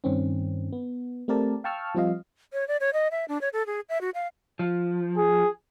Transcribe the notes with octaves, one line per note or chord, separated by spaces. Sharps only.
G2 D#3 C4 C#4
B3
A3 C4 G4 A#4 D5 A5
F5 G5 A5 C#6 E6 F6
F3 G3 C4 F4 D#5 F5
C#5
D5
C#5
D#5
E5
D4
C#5
A4
G#4
E5
F#4
F5
F3
G#4